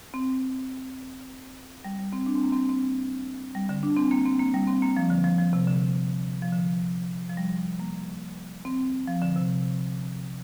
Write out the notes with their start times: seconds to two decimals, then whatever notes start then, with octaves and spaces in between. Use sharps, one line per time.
0.14 C4
1.84 G3
1.99 G3
2.13 C4
2.26 D4
2.35 C4
2.43 A#3
2.52 C4
2.69 C4
3.55 G3
3.69 D3
3.83 D4
3.96 C4
4.11 A#3
4.26 C4
4.39 A#3
4.54 G3
4.67 C4
4.82 A#3
4.97 F3
5.10 D3
5.24 F3
5.38 F3
5.53 C3
5.67 D3
6.42 F3
6.52 D3
7.30 F3
7.37 G3
7.80 A#3
8.65 C4
9.08 F3
9.22 D3
9.36 C3